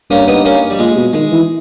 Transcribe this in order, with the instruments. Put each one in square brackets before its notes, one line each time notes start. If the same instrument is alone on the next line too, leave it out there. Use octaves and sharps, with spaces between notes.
[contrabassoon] G2 [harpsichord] A#3 C#4
[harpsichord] B3 D#4
A#3 C#4
G3
[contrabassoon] A#2 [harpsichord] G#3
[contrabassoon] B2
[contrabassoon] D#3 [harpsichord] G#3
[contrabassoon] E3